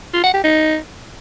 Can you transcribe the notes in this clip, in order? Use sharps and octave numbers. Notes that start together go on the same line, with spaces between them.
F4
F#5
G4
D#4